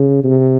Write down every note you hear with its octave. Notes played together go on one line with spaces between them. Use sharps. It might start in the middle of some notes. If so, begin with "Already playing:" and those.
Already playing: C#3
C3